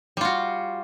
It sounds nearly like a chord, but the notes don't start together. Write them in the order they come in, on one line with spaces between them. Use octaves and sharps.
G3 F4 F#4